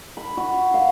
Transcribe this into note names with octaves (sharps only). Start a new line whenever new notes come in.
B5
F#4
F5